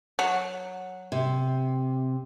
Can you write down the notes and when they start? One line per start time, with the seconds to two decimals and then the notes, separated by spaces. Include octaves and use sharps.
0.19 F#3
1.12 C3